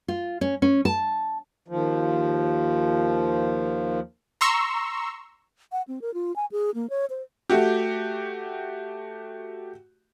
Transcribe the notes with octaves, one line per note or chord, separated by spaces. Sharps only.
F4
C#4
C#4
A5
D#2 F3
A#5 C6 C#6 E6
F#5
C4
A#4
F4
G#5
G#4
A#3
C#5
C5
A3 F#4 G4